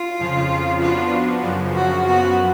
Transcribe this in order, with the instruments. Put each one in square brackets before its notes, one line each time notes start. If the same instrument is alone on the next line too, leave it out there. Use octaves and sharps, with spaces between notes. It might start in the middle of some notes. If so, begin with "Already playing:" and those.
Already playing: [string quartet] F4
[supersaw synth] F2 C#3 F3
[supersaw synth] F3 B3 D4 F#4 [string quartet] F4
[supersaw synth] F#2 C#3 F3
[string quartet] F#4
[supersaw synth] F#2 F3 B3 [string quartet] F#4